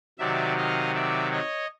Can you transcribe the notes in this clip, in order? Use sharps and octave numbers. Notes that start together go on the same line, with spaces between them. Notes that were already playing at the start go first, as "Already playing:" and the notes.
C3 D#3 F#3 D5 E5
D#5 F5
D5 E5
C#5 D#5